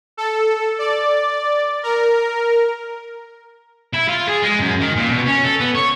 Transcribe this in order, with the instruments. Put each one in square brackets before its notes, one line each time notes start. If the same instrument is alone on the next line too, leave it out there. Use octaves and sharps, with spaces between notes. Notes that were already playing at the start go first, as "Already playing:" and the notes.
[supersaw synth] A4
D5
A#4
[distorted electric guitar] E4
F4
G#4
G#3
F#2
D#3
A#2
B2
C#4
A4
B3
C#5